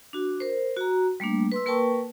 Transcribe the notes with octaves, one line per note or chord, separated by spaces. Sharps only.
D4 F#4
A#4 C5
F#4 A#5
G3 A3 A#3 D4
B4 C6 E6
A#3 A#4 B4 G5 A5 C#6